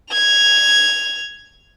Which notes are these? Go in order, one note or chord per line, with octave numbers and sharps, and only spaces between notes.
G#6 F7